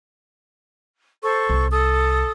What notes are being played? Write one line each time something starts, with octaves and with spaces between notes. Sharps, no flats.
A4 C5 C#6
C2
A4 D#6